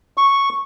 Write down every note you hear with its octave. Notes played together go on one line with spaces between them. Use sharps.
C#6